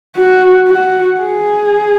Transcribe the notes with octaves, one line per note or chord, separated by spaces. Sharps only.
F#4
F#4
G#4